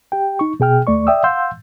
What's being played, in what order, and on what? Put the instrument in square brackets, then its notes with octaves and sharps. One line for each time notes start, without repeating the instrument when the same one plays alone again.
[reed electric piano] G4 G5
D#4 C#6
B2 G#4 G5 F6
D2 A3 D5 C#6
D5 E5 G5 D#6 E6
F5 F#5 C6 E6 G6